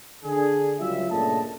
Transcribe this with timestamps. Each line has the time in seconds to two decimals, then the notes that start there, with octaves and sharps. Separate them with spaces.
0.23 D3 G#4
0.79 C#2 F#3 G3 F4 E5
1.10 G2 A#2 C#3 A3 D#5 A5